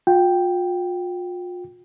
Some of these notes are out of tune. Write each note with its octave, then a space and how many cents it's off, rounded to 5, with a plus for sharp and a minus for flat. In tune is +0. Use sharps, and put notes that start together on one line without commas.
F4 +40 G5 +0